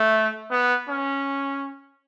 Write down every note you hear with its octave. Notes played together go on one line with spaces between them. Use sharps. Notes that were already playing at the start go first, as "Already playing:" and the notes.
Already playing: A3
B3
C#4